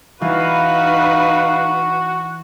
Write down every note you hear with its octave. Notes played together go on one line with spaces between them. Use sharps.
E3 D#4 F#4 B4 F5